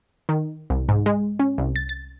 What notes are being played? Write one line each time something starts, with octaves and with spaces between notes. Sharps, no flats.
D#3
C2
G#2
G#3
C#4
C2
A6
A6